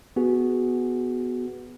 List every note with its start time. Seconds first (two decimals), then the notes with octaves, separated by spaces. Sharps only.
0.16 B3 F#4 G#4